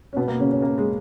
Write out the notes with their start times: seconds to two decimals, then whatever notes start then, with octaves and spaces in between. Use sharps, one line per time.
0.13 C#4
0.17 B2 B3
0.28 A#3
0.39 C#3 C#4
0.51 C#3 C#4
0.62 A#3
0.78 G#3